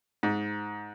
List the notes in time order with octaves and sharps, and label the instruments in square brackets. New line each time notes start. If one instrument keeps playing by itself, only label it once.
[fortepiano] G#2